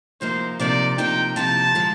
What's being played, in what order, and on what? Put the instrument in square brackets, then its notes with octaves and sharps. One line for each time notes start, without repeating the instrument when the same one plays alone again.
[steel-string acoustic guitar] C3 F3 A#3 D#4 [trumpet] C5
[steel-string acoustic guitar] C3 F3 A#3 D#4 [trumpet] D5
[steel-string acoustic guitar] C3 F3 A#3 D#4 [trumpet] G5
[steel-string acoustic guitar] C3 F3 A#3 D#4 [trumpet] A5
[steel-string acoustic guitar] D3 F3 G#3